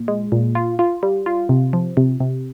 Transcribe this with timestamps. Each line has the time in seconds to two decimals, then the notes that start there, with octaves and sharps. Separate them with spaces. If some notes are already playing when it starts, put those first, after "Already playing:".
Already playing: A#2
0.08 G#3
0.32 A#2
0.55 F4
0.79 F4
1.03 G3
1.26 F4
1.49 C3
1.73 F3
1.97 C3
2.20 C3